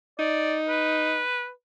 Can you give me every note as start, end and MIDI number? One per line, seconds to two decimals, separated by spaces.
0.19 1.21 63
0.19 0.56 74
0.68 1.50 71